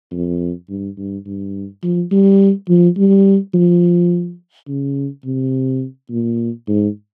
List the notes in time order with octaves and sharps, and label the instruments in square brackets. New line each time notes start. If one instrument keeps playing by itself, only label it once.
[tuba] F2
G2
G2
G2
F3
G3
F3
G3
F3
C#3
C3
A#2
G#2